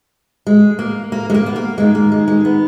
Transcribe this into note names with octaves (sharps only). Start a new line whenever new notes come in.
G#3
A#3
A#3
G#3
A#3
B3
A#3
G#2 D#3 G#3
A#3
G#3
G#3
B3